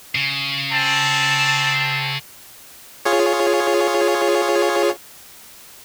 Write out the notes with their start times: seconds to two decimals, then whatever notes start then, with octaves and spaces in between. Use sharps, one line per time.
0.15 C#3
0.71 C4 A5
3.05 F4 G#4 C#5